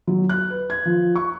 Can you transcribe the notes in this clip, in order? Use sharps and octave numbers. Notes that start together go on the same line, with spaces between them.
F#3
F#6
B4
G#6
F3
C#6